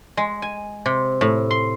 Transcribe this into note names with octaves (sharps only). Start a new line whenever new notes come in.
G#3
G#5
C3
A2
C6